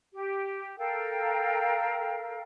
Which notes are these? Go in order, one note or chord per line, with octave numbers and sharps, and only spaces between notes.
G4
A4 A#4 F5 G5